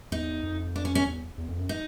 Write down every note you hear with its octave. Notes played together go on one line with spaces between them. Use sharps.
E2 D#4
F2
D4
C#4
C#4
E2
E2
F2
F#2
D#4